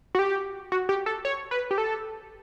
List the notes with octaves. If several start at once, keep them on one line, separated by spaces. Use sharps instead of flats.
F#4
G4
F#4
G4
A4
C#5
B4
G4
A4